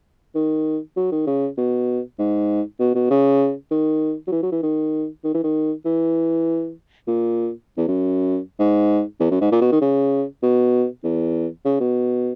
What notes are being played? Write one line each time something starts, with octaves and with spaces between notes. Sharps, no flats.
D#3
F#3
D#3
C#3
B2
G#2
B2
B2
C#3
D#3
F#3
E3
F#3
E3
D#3
D#3
E3
D#3
E3
A#2
E2
F#2
G#2
E2
F#2
G#2
A#2
B2
D#3
C#3
B2
E2
C#3
B2